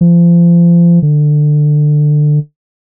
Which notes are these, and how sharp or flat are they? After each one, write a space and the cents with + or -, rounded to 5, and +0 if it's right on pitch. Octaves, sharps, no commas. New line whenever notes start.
F3 -30
D3 +20